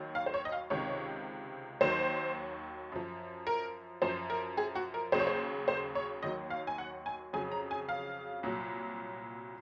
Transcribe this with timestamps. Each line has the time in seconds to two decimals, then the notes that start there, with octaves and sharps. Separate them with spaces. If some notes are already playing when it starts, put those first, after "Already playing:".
Already playing: D#2 D#3 F#3
0.15 F5
0.26 C5
0.34 C#5
0.45 D#5
0.52 F5
0.70 C#2 C3 D#3 C#5
1.81 D#2 D#3 F#3 C5
2.92 F#2 F3
3.47 A#4
4.02 F#2 F3 C5
4.30 A#4
4.57 G#4
4.75 F#4
4.94 A#4
5.12 D#2 C#3 F#3 C5
5.20 C#5
5.27 C5
5.68 C5
5.95 C#5
6.23 D#2 D#3 F#3 D#5
6.50 F5
6.67 G#5
6.78 F#5
7.06 G#5
7.33 F2 C#3 F#3 G#5
7.52 A#5
7.71 G#5
7.89 F5
8.43 C2 A#2 F#3